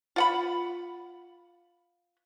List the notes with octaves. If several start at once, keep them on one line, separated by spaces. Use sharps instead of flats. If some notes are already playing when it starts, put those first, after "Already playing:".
F4 F#5 B5